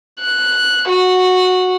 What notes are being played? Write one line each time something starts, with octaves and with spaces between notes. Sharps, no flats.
F#6
F#4